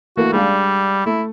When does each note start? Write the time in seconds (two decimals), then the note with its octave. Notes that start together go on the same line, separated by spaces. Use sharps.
0.17 E3 A3 A#3 F#4
0.33 G3 G#3 D4 F5
1.06 A3 E4